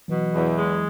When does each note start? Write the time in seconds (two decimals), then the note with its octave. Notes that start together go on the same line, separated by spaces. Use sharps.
0.08 B2 E3 F#3
0.33 E2
0.58 G#3